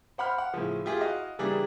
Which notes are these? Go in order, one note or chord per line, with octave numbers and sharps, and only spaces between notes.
C5 F#5 B5 F6
F#5
A2 C#3 F3
A3 F4 G4 G#4
E4 F#4 D#5 F5
C#3 E3 G3 A#3 D4 G#4